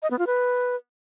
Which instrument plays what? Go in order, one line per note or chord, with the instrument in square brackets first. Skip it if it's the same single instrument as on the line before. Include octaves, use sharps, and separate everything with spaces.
[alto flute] D#5
B3
F4
B4